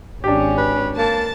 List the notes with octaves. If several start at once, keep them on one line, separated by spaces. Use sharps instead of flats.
G#1 C#4 D4 G4
B4
A#3 A5